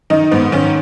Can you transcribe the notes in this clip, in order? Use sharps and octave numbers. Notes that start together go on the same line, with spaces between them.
D#3 D#4
G#2 B3
D#3 C#4